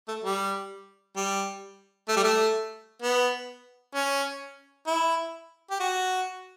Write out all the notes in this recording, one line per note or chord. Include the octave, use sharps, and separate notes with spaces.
A3
G3
G3
A3
G3
A3
B3
C#4
E4
G4
F#4